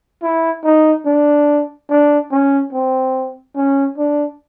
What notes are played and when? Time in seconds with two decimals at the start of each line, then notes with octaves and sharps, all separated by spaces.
0.22 E4
0.64 D#4
1.06 D4
1.89 D4
2.32 C#4
2.73 C4
3.56 C#4
3.98 D4